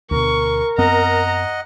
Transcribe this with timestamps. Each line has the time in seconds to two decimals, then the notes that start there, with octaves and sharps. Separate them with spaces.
0.11 D2 B2 A#4 C#6
0.78 F#2 B3 C4 D#5 F#5 A#5